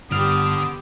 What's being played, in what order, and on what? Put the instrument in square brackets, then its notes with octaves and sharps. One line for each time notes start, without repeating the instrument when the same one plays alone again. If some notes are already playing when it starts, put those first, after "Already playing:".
[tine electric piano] G1 F6 [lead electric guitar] D3 [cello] B3 G4 [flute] D#6